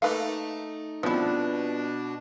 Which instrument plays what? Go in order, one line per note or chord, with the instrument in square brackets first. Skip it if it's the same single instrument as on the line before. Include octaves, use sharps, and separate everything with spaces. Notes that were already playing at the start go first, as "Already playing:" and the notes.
[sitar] A3 D#4 [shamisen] A#3 B4 F5
[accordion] B2 D4 [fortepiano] F3 B3 C4 [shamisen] G3 E4